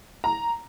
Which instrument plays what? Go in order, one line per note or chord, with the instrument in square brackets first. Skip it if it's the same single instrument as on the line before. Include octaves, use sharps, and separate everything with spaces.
[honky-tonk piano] A#5